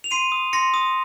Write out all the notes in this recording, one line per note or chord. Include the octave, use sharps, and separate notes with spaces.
F7
C6 C7 D#7
D#6
C6 A#6 C#7
D#6